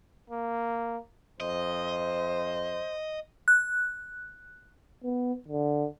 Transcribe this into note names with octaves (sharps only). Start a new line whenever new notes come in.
A#3
F2 C5 D#5
F#6
B3
D3